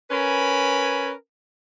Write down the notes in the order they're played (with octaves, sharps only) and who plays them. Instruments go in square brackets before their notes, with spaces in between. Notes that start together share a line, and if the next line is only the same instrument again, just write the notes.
[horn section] C#4 A#4 B4 G#5 B5